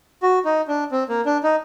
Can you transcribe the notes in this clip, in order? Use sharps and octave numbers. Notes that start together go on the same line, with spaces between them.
F#4
D#4
D4
C4
A#3
D4
D#4